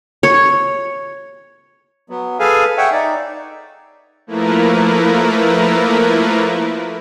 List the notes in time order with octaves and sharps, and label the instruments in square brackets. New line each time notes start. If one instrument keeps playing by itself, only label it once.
[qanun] C#5
[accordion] F#3 B3
G#4 A4 B4 F5 G#5
C#5 E5 F#5 G5
D#4 D5
[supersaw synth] F3 A3 A#3 E4 A#4 B4